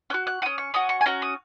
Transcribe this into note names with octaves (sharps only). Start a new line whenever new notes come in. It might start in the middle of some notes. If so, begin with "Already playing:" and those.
C#4 F#4 F#6
F#6
C#4 F#4 D#6
C#6
C#4 F#4 D#6
C#6
G#5
C#4 F#4 A#5
D#6